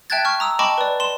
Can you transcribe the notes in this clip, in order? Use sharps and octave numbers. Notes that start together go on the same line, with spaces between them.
E5 G5 A5 F#6 G#6 A6
C#6 F6
A#5 D#6 E6
D#5 G5 A5 B5 C#6 D6
B4 D5
C6 E7